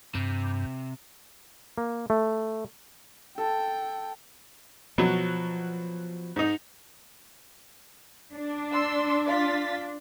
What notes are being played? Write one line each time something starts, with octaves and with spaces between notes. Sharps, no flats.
G2 C3
A#3
A3
A4 G5
B2 F3 F#3
G#2 D#4
D4
C6 E6
F4 A6 B6